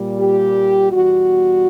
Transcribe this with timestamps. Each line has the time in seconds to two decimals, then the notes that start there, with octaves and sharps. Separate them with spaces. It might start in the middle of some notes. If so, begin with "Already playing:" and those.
Already playing: A#2 G3
0.20 G4
0.92 E2 B2 G3 F#4